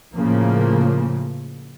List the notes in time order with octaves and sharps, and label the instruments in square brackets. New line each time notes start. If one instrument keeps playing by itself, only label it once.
[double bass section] A2 C#3 F3 A#3